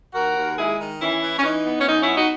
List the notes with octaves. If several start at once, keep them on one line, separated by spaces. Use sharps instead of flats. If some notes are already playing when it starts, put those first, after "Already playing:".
D#2 F#4 A#4
D#2
G#3 E4 G#4
D#3
E3 C#4 E4
E3
C#4
E3 D#4
B3
C#4
F#2 D#4
C#4 E4
B3
D#4 F#4